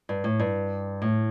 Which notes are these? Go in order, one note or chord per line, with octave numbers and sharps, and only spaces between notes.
G2
A2
G2
A2